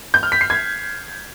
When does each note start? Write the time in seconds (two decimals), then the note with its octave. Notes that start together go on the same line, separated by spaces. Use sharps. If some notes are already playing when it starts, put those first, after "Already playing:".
0.14 G6
0.23 F6
0.32 B6
0.41 C7
0.50 G#6